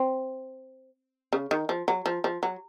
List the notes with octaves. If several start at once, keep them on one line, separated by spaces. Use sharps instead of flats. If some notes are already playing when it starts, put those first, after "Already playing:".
Already playing: C4
C#3
D#3
F3
F#3
F3
F3
F#3